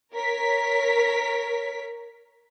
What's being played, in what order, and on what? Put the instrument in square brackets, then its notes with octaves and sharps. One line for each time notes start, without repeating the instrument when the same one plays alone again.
[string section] A#4 C#5 B6